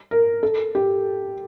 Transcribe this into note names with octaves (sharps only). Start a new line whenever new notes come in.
A#4
A4
G4